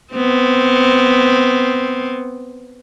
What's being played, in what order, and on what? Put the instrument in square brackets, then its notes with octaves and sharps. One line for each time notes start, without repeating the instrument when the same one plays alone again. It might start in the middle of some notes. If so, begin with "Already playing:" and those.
[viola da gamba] B3 C4